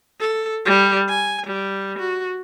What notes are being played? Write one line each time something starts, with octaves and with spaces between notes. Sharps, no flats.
A4
G3
G#5
G3
F#4